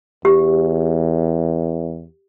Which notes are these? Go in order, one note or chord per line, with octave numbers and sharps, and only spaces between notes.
E2 G4